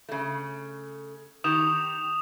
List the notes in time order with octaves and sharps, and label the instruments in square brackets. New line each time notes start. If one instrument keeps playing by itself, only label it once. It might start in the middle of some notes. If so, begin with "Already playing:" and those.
[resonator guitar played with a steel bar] C#3 A3
[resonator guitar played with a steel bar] D#3 G4 [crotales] D#6 E7 F7